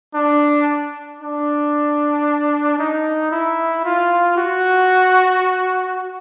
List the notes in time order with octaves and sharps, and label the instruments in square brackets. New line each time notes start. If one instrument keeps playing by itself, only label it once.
[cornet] D4
D4
D#4
E4
F4
F#4